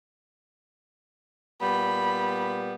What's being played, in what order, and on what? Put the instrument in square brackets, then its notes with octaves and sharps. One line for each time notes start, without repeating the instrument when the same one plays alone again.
[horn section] A#2 G3 B3 [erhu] B5